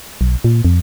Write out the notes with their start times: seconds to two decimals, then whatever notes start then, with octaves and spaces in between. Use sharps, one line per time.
0.21 B1
0.44 A#2
0.65 F2